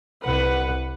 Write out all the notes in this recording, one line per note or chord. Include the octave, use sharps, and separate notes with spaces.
C2 B4 F#5